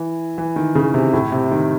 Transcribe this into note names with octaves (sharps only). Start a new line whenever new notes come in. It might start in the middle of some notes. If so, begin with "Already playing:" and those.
Already playing: E3
E3
D#3
C#3
C3
A2
C3
D#3